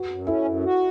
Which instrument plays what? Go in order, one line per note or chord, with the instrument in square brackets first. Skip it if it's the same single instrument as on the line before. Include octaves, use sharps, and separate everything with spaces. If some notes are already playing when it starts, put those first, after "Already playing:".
Already playing: [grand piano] F#4 B4
[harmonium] F#2
[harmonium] C#4 [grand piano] E4 A4
[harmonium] F#2
F#4